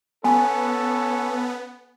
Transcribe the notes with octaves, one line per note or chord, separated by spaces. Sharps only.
B3 C#4 A4 G#5